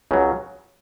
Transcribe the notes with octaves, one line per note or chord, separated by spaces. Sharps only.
C#2 C#3 F#3